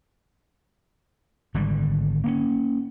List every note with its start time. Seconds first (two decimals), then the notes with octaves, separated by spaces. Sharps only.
1.54 G#1 D3 G3
2.24 A#3 C4 C#4